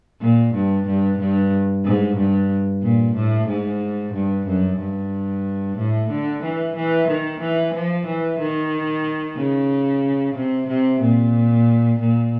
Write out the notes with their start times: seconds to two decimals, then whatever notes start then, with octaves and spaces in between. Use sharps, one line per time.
0.21 A#2
0.54 G2
0.86 G2
1.19 G2
1.85 G#2
2.17 G2
2.83 A#2
3.16 A2
3.48 G#2
4.14 G2
4.47 F#2
4.79 G2
5.78 A2
6.10 D3
6.43 E3
6.76 E3
7.08 D#3
7.40 E3
7.74 F3
8.06 E3
8.39 D#3
9.37 C#3
10.35 C3
10.68 C3
11.01 A#2
11.99 A#2